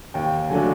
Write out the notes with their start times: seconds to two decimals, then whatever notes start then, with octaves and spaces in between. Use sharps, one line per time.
0.14 D#2 G5
0.49 D3 F#3 A3 D4 G#5